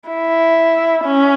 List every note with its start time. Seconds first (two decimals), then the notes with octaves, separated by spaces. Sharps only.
0.09 E4
1.05 C#4